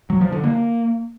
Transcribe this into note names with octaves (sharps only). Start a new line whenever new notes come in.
F#3
F3
D3
A#3